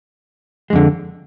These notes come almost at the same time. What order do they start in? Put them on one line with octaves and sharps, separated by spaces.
G#3 F2 D3